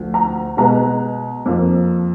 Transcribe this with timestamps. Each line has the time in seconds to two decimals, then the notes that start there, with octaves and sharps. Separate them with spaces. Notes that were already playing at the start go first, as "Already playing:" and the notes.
Already playing: D2 D3 F3
0.14 A#5
0.57 B2 G#3 B3 A#5
1.46 F2 F3 A#3